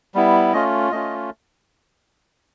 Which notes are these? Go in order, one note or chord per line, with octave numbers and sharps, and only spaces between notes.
G3 B3 E4
A3 C#4 F4 D#5
A3 C#4 F4 D#5